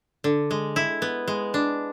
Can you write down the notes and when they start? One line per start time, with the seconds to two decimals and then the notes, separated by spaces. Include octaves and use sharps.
0.24 D3
0.51 G#3
0.76 E4
1.02 B3
1.28 G#3
1.54 D4